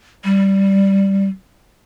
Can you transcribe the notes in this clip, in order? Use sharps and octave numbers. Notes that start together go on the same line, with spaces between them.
G3